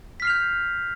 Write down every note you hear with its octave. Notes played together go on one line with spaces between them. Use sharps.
F6 G6 B6 C7 F7